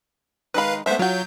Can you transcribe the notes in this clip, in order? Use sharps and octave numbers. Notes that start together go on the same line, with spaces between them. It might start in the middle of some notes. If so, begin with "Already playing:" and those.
D#3 G#3 B4 F5 B5
G#3 A3 B3 C5 E5
F#3 F4 F#4 G6